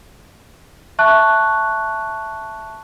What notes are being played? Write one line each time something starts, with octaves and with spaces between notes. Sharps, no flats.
E5 A5 C#6 F#6